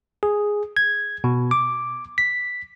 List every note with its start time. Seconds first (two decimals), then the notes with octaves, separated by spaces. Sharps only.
0.23 G#4
0.77 G#6
1.24 B2
1.51 D6
2.18 B6